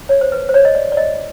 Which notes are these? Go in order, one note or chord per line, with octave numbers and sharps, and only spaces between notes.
C#5
C5
B4
C5
C#5
D#5
D5
D5
D#5